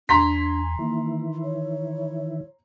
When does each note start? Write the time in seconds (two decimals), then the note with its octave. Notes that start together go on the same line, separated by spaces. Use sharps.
0.09 E2 D4 G#5 A#5 C6 B6
0.79 D#3 E3 A#3 E4
1.44 C#5